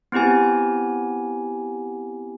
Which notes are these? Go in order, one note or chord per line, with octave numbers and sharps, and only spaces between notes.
B3 C4 E4 G4 G#5